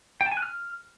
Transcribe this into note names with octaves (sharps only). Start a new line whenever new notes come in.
G5
A5
G#5
F#6
F6